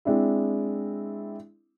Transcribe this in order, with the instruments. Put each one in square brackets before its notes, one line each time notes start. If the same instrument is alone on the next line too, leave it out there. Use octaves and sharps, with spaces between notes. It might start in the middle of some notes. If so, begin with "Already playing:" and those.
[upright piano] G#3 C4 D4 E4